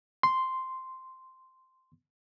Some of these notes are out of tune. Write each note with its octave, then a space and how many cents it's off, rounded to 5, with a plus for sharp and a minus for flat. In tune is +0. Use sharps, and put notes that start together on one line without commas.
C6 -5